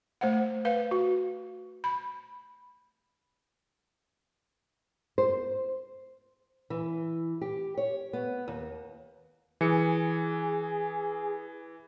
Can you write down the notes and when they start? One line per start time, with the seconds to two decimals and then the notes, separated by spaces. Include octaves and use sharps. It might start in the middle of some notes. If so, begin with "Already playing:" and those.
0.21 A3 C5 F5 F#5
0.65 B4 F5
0.91 F#4
1.84 B5
5.18 C5
6.70 E3
7.41 G4
7.77 C#5
8.13 B3
8.48 D#2
9.61 E3 G#4 C#7